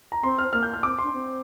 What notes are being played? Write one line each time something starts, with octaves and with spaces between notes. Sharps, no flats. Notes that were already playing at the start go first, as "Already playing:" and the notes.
A#5
C4 C6
F6
A#3 F6
G6
F6
C4 D6
D4 C6
C4